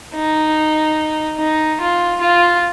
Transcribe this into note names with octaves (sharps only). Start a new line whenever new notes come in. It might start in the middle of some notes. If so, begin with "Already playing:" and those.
D#4
D#4
F4
F4